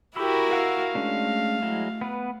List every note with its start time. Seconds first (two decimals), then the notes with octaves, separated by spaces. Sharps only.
0.16 E4 F#4 G4 A#4 B5 E6
0.53 F5 F#5 E6
0.95 G#3 A3 C#4 D4
1.62 F#3 G#3 E4
2.01 B3 B4